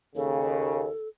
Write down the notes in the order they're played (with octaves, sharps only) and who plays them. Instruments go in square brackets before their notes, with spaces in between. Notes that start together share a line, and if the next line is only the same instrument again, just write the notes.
[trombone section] D#2 C#3 [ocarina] A4